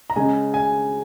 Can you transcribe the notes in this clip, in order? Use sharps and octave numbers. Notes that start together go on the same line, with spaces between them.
A#5
C#3 G#3 G#5
G#5